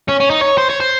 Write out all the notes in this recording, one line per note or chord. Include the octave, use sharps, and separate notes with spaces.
C#4
C#4
D#4
C#5
C5
C#5
C5